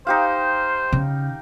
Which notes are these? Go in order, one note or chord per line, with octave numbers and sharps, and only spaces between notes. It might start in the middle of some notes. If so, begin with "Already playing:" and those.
D#4 G4 C5 F5
C#3